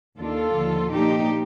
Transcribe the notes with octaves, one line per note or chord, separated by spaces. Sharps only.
D#2 D#3 A#3 D4 F4 A4
D#2 D3 F3
A#2 F3 A#3 D4 D#4 G4